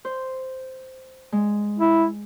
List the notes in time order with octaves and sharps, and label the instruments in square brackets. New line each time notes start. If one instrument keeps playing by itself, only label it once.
[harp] C5
G#3
[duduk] E4